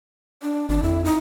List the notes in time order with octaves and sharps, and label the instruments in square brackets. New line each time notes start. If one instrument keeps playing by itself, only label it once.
[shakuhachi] D4
[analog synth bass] G#1 [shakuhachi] D4
[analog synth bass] F2 [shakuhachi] E4
[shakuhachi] D#4